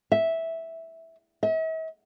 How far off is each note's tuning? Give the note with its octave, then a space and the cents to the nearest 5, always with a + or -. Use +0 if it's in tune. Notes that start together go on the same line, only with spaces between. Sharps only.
E5 -10
E5 -45